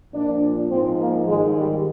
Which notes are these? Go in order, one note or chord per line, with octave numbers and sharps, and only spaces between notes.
A#2 F3 D4
G#2 F3 C4
A#3
G#2 D#3 G#3
G3